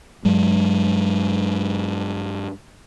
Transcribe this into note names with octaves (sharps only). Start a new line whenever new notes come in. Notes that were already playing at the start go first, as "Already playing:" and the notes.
G2 F#3 G#3